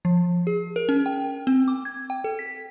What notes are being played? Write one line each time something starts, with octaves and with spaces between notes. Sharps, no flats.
F3
G#4
A#4
C#4
G5
C4
D6
G#6
G5
A4
B6